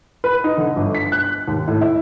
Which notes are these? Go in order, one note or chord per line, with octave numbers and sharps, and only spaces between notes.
B4
D#4
D3
G1
B6
F#6
D#2
A2
E4